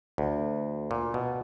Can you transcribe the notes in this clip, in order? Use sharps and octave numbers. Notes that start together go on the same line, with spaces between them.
D2
A#2
B2